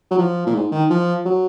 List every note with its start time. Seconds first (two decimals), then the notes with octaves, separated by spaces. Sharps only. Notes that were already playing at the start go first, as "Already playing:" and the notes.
0.11 F#3
0.18 F3
0.47 A#2
0.54 G#2
0.72 D#3
0.90 F3
1.25 F#3